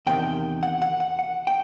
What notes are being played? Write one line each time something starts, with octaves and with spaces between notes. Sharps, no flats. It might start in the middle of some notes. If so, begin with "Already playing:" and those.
E2 C3 D#3 G5
F#5
F#5
F#5
F#5
G5